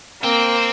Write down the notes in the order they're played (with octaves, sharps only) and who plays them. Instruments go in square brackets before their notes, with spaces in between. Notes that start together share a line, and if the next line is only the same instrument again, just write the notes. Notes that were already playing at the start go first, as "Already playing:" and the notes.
[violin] A#3 [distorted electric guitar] C4